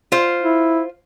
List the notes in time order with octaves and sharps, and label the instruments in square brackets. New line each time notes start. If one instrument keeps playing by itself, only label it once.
[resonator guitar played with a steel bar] F4 C5
[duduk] E4